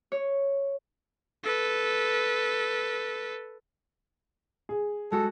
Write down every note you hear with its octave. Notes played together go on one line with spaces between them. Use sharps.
C#5
A4 B4
G#4
G#3 F#4 A4